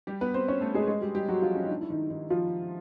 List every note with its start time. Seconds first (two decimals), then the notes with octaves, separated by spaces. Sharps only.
0.07 G3 G4
0.21 B3 B4
0.34 C4 C5
0.48 C#4 C#5
0.61 A3 A4
0.74 G#3 G#4
0.88 G#3 G#4
1.01 G3 G4
1.15 G3 G4
1.28 F#3 F#4
1.42 F3 F4
1.55 C#4
1.65 D#4
1.69 D4
1.81 E4
1.90 D#3 D#4
2.10 D#3 D#4
2.30 F3 F4